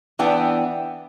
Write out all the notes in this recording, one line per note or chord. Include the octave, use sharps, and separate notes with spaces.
E3 B3 D4 G5